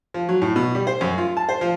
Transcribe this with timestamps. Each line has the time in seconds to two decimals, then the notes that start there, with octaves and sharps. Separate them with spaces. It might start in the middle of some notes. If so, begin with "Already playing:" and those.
0.14 F3
0.29 F#3
0.42 A2
0.56 B2
0.75 G3
0.87 C5
1.01 F#2
1.18 F4
1.37 A5
1.49 C5
1.61 F3